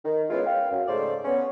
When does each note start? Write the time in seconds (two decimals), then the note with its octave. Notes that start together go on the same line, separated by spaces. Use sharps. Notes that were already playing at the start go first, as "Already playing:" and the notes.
0.05 D#3
0.30 G#3 B3 C#4 E4 F4
0.47 F5 G5
0.72 F#2
0.88 G#2 C#3 A3 C5 D5
1.25 B3 C#4